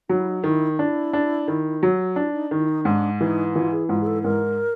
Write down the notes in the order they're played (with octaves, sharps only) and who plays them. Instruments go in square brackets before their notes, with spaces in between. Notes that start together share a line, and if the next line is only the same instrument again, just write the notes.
[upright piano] F#3 [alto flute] D#4
[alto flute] E4
D#4
[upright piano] D#3 [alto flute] E4
[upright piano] D4 [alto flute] E4
[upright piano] D4
D#3
F#3
[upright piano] D4 [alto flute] E4
[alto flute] D#4
[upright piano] D#3
[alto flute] E4
D#4
[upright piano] G#2 [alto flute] D4
[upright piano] E3 [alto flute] D#4
[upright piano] E3 [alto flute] F4
[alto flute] G#4
[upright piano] G#2 [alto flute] F4
[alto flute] G#4
A4
[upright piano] G#2 [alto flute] A#4